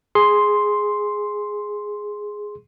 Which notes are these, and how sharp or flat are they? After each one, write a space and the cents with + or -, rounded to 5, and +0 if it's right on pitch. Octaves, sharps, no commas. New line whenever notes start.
G#4 +0 C6 +0